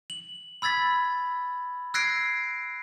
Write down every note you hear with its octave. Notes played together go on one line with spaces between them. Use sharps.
F#7
B5 E6 G#6 A6 B6
E6 F#6 G#6 A#6 C7 D7